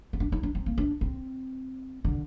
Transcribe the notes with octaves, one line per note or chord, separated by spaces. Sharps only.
C4
D4
D#4
D4
C4
A#3
D4
C4
D3